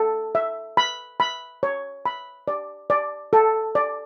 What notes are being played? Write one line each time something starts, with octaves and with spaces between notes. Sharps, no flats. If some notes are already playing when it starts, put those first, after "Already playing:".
Already playing: A4
E5
B5
B5
C#5
B5
D5
D5
A4
D5